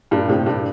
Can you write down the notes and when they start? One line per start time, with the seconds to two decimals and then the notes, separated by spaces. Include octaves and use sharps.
0.11 G2 A#2
0.28 A2 C3
0.46 G2 A#2